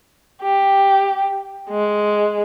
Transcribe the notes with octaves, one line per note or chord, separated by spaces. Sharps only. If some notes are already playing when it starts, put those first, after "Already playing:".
G4
G#3